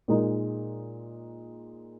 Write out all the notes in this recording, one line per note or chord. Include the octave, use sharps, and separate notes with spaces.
A#2 G#3 D#4